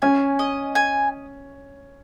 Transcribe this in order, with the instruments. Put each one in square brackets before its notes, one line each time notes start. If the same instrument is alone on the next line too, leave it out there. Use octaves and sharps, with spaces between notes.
[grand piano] C#4 [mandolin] G#5
[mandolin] D#5
G#5